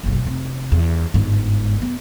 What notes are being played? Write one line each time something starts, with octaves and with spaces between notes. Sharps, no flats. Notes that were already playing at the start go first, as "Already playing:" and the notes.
F#1 B1
F1 C3
E2
G1 G#2
B3